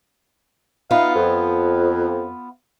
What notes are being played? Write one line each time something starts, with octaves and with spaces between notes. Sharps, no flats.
B3 D#4 F4 F5
F2